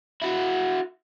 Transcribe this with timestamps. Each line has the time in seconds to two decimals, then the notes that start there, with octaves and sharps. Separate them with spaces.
0.22 E4 F#4